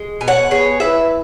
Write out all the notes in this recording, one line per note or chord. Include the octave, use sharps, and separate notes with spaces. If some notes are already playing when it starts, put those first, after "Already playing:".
Already playing: G#3
B2 G#5
C#5 F#5
B3 G#4 C#5
E3 B4 E5